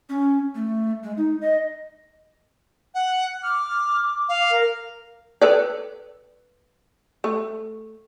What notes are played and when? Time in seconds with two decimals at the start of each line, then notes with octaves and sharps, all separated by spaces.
0.09 C#4
0.55 A3
1.03 G#3
1.17 D#4
1.41 D#5
2.94 F#5
3.43 D6 F6
4.29 F5
4.50 A#4
5.42 A4 B4 D5
7.24 A3